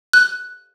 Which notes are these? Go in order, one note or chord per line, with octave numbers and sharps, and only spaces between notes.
F#6